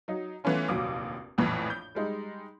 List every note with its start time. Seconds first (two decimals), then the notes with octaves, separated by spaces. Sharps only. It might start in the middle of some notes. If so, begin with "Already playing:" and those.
0.08 F#3 D#4
0.44 E3 A3 B3 C#4 F4
0.68 F1 A#1 D#2 F#3 D6 D#6
1.38 A#1 F2 A2 E3
1.70 G6
1.95 G3 G#3 D#4